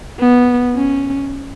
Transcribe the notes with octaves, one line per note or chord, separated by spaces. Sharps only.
B3
C#4